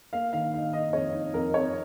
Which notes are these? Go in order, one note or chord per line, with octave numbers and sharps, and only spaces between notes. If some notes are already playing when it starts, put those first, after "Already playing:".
A#3 F5
D#3 F5
D#4 F5
D#4 D#5
F2 C#5
D#4
F2 A#4
F2 C#5